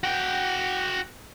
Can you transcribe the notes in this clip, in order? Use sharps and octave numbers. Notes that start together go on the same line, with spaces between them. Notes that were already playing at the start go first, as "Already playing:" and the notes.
F#4 G5